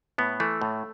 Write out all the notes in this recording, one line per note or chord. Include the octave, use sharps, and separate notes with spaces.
A2 B3
E3 A3
A2